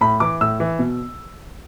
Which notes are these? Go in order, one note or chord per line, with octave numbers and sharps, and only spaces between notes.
A2 B5
E3 D6
A2 E6
E3
B2